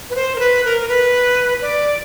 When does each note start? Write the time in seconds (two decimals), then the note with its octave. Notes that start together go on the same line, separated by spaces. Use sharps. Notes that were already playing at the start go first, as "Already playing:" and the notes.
0.10 B4
0.15 C5
0.36 A#4
0.40 B4
0.65 A#4
0.80 A#4
0.88 B4
1.62 D5